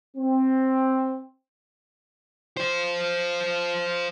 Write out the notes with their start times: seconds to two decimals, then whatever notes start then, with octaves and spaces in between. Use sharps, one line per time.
0.17 C4
2.57 F3 C5